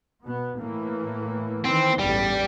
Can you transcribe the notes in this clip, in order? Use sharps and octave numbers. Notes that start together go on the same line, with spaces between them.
B2 B3
A2 E3 A#3
D#3 E3 C4
A1 E2 G2 G3